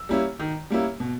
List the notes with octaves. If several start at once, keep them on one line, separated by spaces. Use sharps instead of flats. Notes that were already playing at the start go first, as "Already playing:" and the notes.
Already playing: E6
G3 A#3 C#4 E4
D#3
G3 A#3 C#4 E4
B2